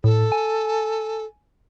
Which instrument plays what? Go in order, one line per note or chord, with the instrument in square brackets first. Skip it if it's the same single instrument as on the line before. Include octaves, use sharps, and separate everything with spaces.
[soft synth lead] A2 [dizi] A4
[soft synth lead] G#5